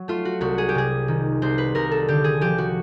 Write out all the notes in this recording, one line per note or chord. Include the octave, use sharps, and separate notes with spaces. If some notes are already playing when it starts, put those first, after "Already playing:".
Already playing: F#3
A3 F4
F#4
C2 F#4
G#4
G4
C3 G#4
D#3
C2 C5
B4
C2 A#4
A4
D3 G4
G#4
F3 G4
F#4